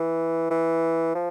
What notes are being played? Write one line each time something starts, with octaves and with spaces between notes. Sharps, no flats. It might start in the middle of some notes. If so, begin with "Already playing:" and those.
Already playing: E3
E3
F3